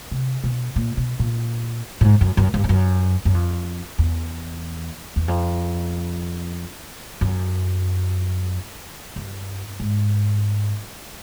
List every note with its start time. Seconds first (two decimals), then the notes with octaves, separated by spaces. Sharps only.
0.11 C3
0.44 B2
0.76 A#2
0.97 B2
1.19 A#2
2.01 A2
2.04 G#2
2.21 F#2
2.37 F#2
2.54 G2
2.64 G2
2.69 F#2
3.25 F#2
3.34 F2
3.98 E2
5.16 E2
5.28 F2
7.21 F#2
9.16 G2
9.80 G#2